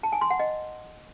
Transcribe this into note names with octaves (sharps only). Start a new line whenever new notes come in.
A5
G#5
C6
F#5
D#5